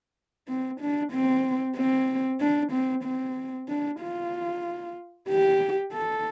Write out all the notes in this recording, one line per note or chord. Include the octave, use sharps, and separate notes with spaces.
C4
D4
C4
C4
D4
C4
C4
D4
F4
G4
A4